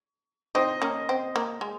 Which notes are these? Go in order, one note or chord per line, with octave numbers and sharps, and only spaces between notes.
C4 D#4 C5 D#5
A#3 C#4
C4
A#3
G#3